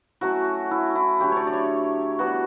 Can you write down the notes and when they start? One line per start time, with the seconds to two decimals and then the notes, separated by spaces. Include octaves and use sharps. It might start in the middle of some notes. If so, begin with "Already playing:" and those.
0.21 F#3 A3 C#4 E4 F#4
0.71 E4
0.95 E4
1.20 D3 F#3 A3 G4
1.32 C#5 D5
1.47 D5
1.53 C#5
2.19 E3 G3 B3 D4 F#4